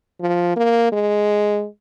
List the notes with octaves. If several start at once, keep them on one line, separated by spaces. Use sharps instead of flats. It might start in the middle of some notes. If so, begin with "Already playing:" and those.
F3
A#3
G#3